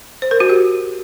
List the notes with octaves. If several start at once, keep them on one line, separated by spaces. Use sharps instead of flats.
C5
A#4
F#4
G4